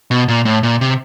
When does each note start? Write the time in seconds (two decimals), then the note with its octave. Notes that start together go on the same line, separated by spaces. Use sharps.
0.11 B2
0.28 A#2
0.45 A2
0.63 A#2
0.81 C3